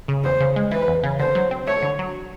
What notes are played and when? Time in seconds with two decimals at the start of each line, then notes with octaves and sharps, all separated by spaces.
0.08 C#3
0.24 E2 C5
0.40 C#3
0.56 G#3
0.71 E3 B4
0.88 E2
1.03 C#3
1.19 D3 C5
1.35 F#3
1.51 C4
1.67 A3 C#5
1.82 D3
1.99 F#3